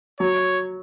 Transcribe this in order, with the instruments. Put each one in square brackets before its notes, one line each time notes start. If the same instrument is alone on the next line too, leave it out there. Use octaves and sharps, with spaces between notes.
[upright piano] F#3 [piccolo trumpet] C#5